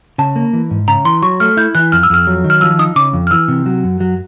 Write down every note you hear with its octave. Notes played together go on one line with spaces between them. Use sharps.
C#3 A5
A#3
E3
G#2
C#3 A#5
E3 C6
F#3 C#6
A3 F6
E4 G6
E3 F#6
F2 F6
E6
F2 F6
F#3
D#3
F6
F3 E6
D#4 D#6
C#3 D6
F2
F6
E3 E6
C3
F#3
F#2
F#3